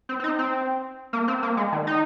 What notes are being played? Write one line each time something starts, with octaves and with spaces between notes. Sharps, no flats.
C4
C4
D#4
C4
A#3
C4
A#3
G#3
D#3
D#4